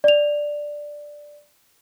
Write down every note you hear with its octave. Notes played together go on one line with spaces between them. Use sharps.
D5 F7